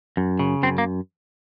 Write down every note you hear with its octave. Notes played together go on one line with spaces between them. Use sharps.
F#2
C#3
F#2 C4
A#3